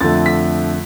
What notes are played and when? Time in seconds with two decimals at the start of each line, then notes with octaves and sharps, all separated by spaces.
0.01 F2 D3 F3 A3 A6
0.26 B6